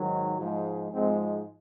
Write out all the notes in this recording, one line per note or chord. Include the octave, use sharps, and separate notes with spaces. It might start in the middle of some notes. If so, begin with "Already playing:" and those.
Already playing: G#2 D#3 F#3
G#2 F3 G#3
G#2 F3 G#3 C4